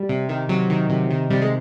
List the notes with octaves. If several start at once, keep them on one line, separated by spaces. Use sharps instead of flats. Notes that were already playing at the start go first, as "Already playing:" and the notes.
Already playing: G3
C3
D#3
C3 F#3
D#3
C3
D#3
C3 G3
G#3